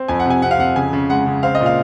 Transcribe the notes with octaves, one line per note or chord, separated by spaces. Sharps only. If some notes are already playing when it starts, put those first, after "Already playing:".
Already playing: C4
F2 G#5
F#5
C3 G#5
C3 F#5
F5
F2 F#5
C#3 G#5
C#3
G#3 F#5
C#3
C4 F5
D#5
A#2
F5